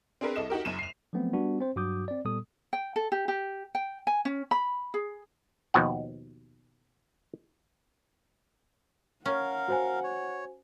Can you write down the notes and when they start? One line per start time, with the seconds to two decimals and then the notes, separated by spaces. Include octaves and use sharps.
0.21 C4 D4 G#4 A#4 B4
0.36 C2 A4 D#5 E7
0.50 D#4 F#4 G4 A#4
0.65 F#1 F#2 D#7 E7
0.79 C7 F7
1.13 F3 F#3 A3 B3 C4
1.33 G3 B3 D4 F#4
1.60 C4 C5
1.76 G2 F#3 F#4 D6 D#6 G6
2.08 C4 D5
2.25 A#2 G3 B3 A4 D#6
2.73 G5
2.96 A4
3.12 G4
3.28 G4
3.75 G5
4.07 G#5
4.25 C#4
4.51 B5
4.94 G#4
5.74 D#2 B2 F3 F#5
9.26 C#4 A#4 F5 F#5
9.68 F#4 C5 G#5
10.04 C#5